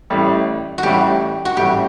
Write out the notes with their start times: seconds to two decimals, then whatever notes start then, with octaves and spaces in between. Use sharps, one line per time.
0.10 A1 A2 G3
0.78 F#4
0.83 A1 A2 G3 G4
1.45 F#4
1.57 A1 A2 G3 G4